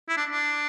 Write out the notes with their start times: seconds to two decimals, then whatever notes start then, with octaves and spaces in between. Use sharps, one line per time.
0.09 E4
0.17 D4
0.30 D4